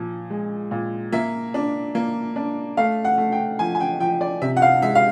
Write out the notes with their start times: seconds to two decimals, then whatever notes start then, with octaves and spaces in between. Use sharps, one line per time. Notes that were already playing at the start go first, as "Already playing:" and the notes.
Already playing: A#2 F3
0.30 G#3
0.71 A#2
1.13 A#3 E5
1.54 D4
1.95 A#3
2.36 D4
2.77 A3 F5
3.05 F#5
3.18 A3
3.32 G5
3.59 F3 G#5
3.75 G#5
3.80 G5
4.00 F3 G5
4.21 D5
4.42 C3 E5
4.57 F#5
4.62 F5
4.82 G#3 E5
4.95 F5